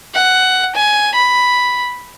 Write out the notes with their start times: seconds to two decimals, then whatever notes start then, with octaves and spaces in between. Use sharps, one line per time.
0.15 F#5
0.75 G#5
1.15 B5